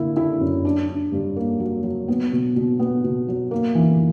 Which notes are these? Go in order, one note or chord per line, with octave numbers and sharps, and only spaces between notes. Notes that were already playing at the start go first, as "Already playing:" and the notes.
Already playing: D3 A#3 E4
E4
F#2
D4
D4
G2
A#3
F#3
F#3
B3
B2
B2
B3
B2
F#3
A#3
E3